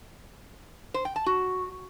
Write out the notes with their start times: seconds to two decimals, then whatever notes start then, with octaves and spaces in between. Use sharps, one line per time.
0.94 C5
1.05 G5
1.16 A5
1.26 F#4